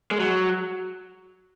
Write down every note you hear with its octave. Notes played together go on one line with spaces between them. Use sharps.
G#3
F#3